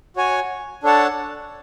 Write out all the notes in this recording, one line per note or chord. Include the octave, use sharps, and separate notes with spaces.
F#4 C#5 G#5
D4 A4 C#5 F#5 A5